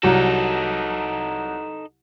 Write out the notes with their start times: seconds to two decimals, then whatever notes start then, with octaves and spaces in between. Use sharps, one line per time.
0.03 C2 F#3 D#4 A4